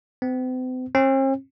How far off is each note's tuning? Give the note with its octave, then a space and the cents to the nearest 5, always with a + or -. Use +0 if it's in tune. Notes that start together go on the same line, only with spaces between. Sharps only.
C4 -45
C4 +45